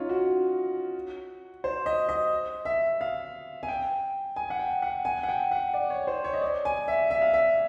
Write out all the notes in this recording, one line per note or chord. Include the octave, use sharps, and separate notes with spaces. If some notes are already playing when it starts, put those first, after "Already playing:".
Already playing: C#4 D#4 F4
F#4
C5
D#5
D#5
E5
F5
G#5
G5
G#5
F#5
G5
F#5
G#5
F#5
G5
F#5
D5
C#5
C5
C#5
D#5
D5
G#5
E5
E5
F5
E5